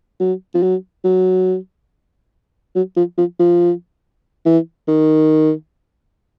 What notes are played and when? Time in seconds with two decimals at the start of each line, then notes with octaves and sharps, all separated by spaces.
0.20 F#3
0.55 F3
0.62 F#3
1.05 F#3
2.75 F#3
2.97 F3
3.18 F3
3.39 F3
4.45 E3
4.88 D#3